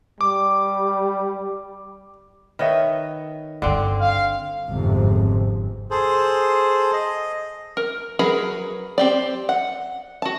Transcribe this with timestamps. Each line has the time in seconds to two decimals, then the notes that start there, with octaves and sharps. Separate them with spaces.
0.21 G3 D6
2.59 D#3 B4 C#5 D#5 E5
3.62 G1 G2 D3 C4 D5
4.01 F5
4.67 G1 F2 G#2 C3
5.91 G#4 A4 C5
6.93 D#5
7.77 A#4
8.19 F#3 G#4 A#4 B4 B5
8.98 C4 G4 D5
9.49 F#5
10.22 F#4 A5